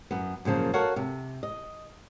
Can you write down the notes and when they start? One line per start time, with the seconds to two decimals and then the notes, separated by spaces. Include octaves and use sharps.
0.11 F#2 B3
0.45 F#2 A#2 C#3 F3
0.73 F#4 A4 A#4 C#5 F5 F#5
0.96 C3
1.43 D#5